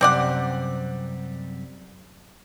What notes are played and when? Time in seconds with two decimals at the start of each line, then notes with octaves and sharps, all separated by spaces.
0.01 F#2 C3 G3 C4 D5 F#5